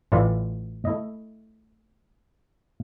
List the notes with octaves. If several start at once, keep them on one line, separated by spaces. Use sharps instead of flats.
A1 A2 E3 E4 F4 D5
A3 E4 D#5